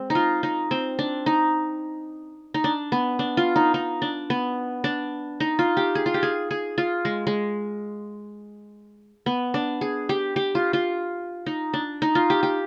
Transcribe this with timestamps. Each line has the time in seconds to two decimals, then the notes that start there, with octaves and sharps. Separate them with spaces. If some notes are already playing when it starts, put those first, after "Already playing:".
Already playing: G#3 C4
0.10 D#4
0.15 F4
0.43 D#4
0.71 C4
0.99 D4
1.26 D#4
2.54 D#4
2.64 D4
2.92 B3
3.19 D4
3.37 F4
3.56 D#4
3.74 D#4
4.02 D4
4.30 B3
4.84 D4
5.40 D#4
5.59 F4
5.77 G4
5.95 G#4
6.06 F4
6.14 G4
6.23 G#4
6.51 G#4
6.78 F4
7.05 G#3
7.27 G#3
9.26 B3
9.54 D4
9.81 G#4
10.09 G4
10.36 G4
10.55 F4
10.73 F4
11.46 D#4
11.74 D4
12.02 D#4
12.15 F4
12.30 G4
12.43 G4